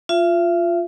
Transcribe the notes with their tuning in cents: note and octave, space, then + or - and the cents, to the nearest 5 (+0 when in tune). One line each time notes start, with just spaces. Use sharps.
F4 +0 E5 +40